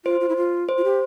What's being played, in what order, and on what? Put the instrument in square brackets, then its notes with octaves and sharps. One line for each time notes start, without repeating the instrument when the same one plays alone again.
[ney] F4 [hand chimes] C5
[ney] F4
E4
F4
[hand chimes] C5
[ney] F4
G4